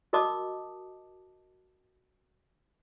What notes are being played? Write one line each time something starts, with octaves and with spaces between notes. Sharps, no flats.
F#4 A#4 D#5 A5 D6 D#6